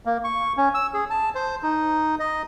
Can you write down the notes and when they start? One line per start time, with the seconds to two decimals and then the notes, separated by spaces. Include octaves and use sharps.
0.05 A#3
0.24 C#6
0.57 C#4
0.74 E6
0.94 G#4
1.10 A5
1.35 C5
1.63 D#4
2.19 D#5